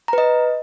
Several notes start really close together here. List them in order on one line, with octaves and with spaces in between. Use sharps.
A#5 B4 D#5